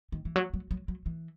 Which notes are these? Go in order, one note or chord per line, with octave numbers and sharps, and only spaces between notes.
D#3
E3
F#3
F#3
F#3
F#3
E3